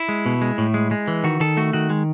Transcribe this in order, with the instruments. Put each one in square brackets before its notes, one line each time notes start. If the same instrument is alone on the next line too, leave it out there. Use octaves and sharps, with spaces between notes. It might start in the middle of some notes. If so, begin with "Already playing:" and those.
Already playing: [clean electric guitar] E4
G#3
B2
G#3
A2
G#3
G#3
E3
D#3 F#4
D#3 A4
A3 F#4
D#3 F#4
G#3